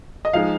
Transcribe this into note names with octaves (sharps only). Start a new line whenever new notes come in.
D#5
F3 G#3 D#4 F5